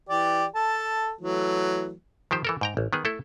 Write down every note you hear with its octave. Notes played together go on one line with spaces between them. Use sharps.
E3 G4 D5
A4 A5
E3 F#3 A3
D#3 F3 G4 C5
E3 A4 A#4
G#2 G5 A#5
A1
D#3 B3 G#4
A3 E4 A4